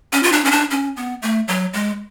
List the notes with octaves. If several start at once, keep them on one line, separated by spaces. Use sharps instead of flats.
C#4
F4
D4
C#4
D4
C#4
B3
A3
F#3
G#3